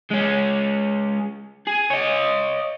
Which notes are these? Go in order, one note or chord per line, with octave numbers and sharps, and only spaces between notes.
G#3 C#4
G#4
C#5 D#5